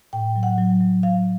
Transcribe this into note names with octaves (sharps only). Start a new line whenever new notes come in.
A2 G5
F#3
F#5
F#3
F#3
F#3 F5